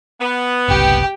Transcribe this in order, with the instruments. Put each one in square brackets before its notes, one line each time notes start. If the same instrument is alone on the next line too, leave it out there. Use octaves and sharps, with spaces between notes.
[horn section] B3
[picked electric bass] F#1 C2 [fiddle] G4 G5